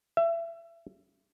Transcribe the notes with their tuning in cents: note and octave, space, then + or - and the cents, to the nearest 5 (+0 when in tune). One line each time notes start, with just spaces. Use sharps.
E5 +30